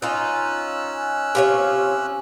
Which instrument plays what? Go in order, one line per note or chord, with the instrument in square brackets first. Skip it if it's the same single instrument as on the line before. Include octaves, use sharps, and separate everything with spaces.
[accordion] C#4 E6 F#6 [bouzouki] D#4 F4
[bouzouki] C3 F4 C#5